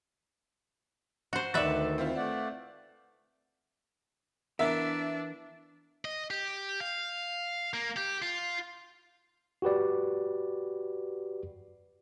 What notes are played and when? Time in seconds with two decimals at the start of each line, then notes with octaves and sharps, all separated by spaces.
1.33 F#4 C5
1.54 D2 D#3 F#4 B4 D5 E5 A6
1.98 C4 E4 F4
2.16 A3 D5 F#5
4.59 E3 B3 D4 A#4 E5
6.05 D#5
6.30 G4
6.80 F5
7.74 A#3
7.97 G4
8.22 F4
9.62 F#4 G4 B4 D5